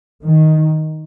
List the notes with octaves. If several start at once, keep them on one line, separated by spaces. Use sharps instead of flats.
D#3